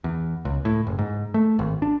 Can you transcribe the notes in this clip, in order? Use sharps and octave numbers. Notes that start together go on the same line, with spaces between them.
E2
C#2
A2
F#1
G#2
A3
G#1
D4